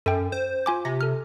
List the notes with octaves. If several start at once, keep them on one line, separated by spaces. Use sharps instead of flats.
F#2 A4 G5
C5
F4 G#5 D6
C3 A#6
A4 F6